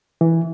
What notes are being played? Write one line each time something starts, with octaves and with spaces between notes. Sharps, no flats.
E3